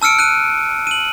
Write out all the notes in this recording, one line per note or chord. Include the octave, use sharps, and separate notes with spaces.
A5 E6 F6 C#7 D7
F#6 D#7
D#7 F#7